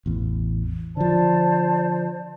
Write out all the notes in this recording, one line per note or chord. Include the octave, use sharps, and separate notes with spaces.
A1 E2
D3 F3 C5 D5 A5